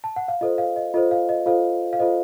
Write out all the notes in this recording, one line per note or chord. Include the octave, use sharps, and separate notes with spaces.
A5
F#5
F5
F4 A4 C5 D#5
F5
D#5
F4 A4 C5 D#5
F5
D#5
F4 A4 C5 F5
F5
F4 A4 C5 D#5